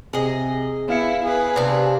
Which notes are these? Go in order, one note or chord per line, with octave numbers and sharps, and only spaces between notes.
C3 G#4 D#5
B3 E4 F5 C#7
G#4 B4
C3 D4